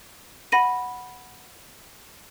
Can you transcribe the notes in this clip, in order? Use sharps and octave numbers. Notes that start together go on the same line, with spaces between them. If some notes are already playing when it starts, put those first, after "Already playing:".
F#5 B5 A#6 D#7